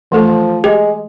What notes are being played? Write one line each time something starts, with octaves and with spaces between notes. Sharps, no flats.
E3 F3 A3 A4
G#3 G4